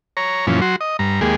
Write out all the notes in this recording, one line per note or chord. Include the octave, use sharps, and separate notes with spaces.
C#5 A#5
F#2 A#2 E3 F3 C#4
F#3 F#4 C6
D#5
G2 A#5
D#2 G#3 A#3 G4 G#4